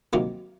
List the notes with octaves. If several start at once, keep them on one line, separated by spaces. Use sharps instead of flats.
C3 D#3 F#3 A#3 F4